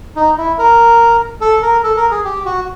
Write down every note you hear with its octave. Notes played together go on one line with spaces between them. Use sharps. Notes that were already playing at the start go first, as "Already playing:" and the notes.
D#4
E4
A#4
A4
A#4
A4
A#4
G#4
G4
F#4